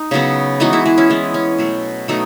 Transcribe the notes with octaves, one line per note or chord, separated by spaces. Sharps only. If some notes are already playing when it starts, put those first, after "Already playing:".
Already playing: D#4
C#3 F#3 B3
E3 G#3 B3 D#4 F#4
E4 G#4
E4 G#4
C#4 E4
E3 G#3 B3
C#4
B2 F#3 A3
B2 F#3 A3 D#4